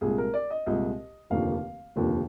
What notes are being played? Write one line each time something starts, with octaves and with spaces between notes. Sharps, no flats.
C2 A#2 G#3 G#4
A#4
D5
D#5
C2 A#2 G#3 D#5
F1 D#2 D3 F3 A#3 F5
F1 D#2 D3 F3 A#3